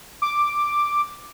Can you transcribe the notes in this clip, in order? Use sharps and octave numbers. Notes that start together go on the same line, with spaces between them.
D6